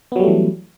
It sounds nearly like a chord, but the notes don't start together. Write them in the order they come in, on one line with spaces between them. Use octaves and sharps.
B3 F#3 G3 A3 E3